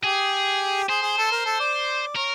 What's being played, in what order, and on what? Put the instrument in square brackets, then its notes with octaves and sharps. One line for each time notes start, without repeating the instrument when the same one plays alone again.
[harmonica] G4 [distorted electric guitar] G#4
[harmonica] G#4 [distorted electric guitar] C5
[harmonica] G#4
A4
A#4
A4
D5
[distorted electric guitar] A#4 [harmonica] C#5